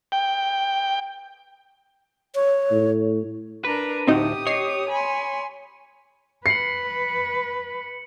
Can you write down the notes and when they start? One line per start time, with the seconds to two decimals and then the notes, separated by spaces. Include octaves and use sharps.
0.12 G5
2.35 C#5
2.71 A2
3.65 D4 A#4 B4 A#5
4.07 D2 A2 C4 D#4 F#4 G4 D#6
4.47 C#5 D#5 C7
4.89 G#5 B5 C6
6.46 B4 C7 C#7 F#7